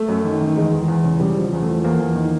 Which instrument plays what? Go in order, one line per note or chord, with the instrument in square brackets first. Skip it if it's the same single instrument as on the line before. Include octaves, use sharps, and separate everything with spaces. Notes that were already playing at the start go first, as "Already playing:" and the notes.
Already playing: [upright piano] A3
F#2
D#3
D#3
E2 G#3
E2
E2
C#3
C#3 G3
F3
E2
A3
F3
E2 A#3
E2
D#3